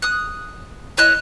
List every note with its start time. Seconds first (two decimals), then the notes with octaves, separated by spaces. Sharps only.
0.02 D#6 F#6
0.97 E4 C#5 D#5 F#6